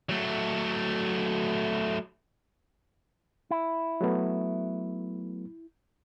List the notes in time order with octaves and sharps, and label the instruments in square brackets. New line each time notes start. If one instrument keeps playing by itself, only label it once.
[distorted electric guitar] F#3 A3
[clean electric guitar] E4
[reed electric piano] F#3 A3 B3